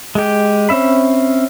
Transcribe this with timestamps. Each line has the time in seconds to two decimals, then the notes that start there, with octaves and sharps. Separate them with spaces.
0.15 G#3 G4
0.69 C4 C#4 E5 B5